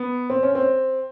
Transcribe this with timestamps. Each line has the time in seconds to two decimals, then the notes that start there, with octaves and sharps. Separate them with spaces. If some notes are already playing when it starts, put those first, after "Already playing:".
Already playing: B3
0.30 C4
0.43 C#4
0.55 C4